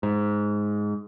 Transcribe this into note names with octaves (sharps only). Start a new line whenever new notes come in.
G#2